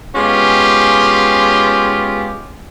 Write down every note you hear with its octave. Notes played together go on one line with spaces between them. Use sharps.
G#3 B3 C#4 F4 G4